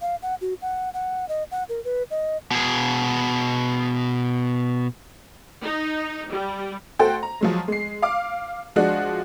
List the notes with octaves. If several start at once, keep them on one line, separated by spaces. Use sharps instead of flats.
F5
F#5
F#4
F#5
F#5
D#5
F#5
A#4
B4
D#5
B2 G#4
D#4
G3
A3 F#4 A4 C5 G5
A#5
F3 F#3 G#3
G#3 C7
F5 D6
F3 G#3 D4 F#4